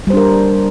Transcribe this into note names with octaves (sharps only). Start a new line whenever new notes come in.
G3 D4 A#4 C5